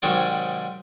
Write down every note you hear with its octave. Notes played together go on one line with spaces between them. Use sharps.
G#2 C3 D#3 F#3 C#5 D5